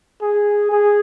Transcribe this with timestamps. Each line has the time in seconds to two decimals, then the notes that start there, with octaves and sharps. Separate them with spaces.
0.21 G#4
0.72 G#4